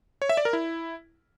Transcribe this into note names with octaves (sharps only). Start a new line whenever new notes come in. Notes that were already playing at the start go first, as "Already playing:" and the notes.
C#5
E5
D5
A#4
E4